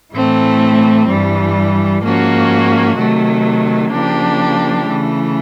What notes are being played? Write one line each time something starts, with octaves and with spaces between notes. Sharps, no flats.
A2 E3 A3 C4
G2 E3 G3
G#2 F3 A#3 C#4 F#4
C3 D#3 F#3 A3
C#3 F3 A#3 D4 G4
C#3 E3 A3